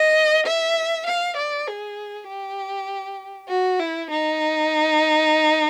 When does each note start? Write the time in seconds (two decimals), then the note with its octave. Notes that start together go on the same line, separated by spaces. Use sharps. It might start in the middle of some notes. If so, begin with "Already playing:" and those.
Already playing: D#5
0.47 E5
1.07 F5
1.37 D5
1.68 G#4
2.28 G4
3.49 F#4
3.79 E4
4.10 D#4